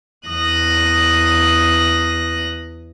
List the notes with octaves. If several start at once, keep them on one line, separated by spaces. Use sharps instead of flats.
E2 D#6 F#6 A#6